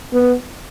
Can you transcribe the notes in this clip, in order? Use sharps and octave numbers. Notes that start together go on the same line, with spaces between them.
B3